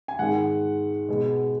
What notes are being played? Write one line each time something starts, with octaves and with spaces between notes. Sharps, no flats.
G#5
G#2 D#3 G#3 F#5
B2 G#3